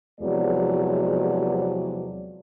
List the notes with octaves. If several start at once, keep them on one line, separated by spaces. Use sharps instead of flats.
E2 C3 F3 F#3 G#3 D5